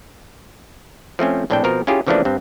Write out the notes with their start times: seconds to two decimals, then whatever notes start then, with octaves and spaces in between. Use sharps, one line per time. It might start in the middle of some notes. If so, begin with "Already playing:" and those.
1.19 F3 A3 C4 C#4
1.50 A#1 A2 C4 D4 A4 G5
1.64 B2 F3 C4 A#4
1.87 C#4 E4 F4 G4 G#4
2.07 C#3 E3 F3 A3 A#3 D4
2.25 G2 C4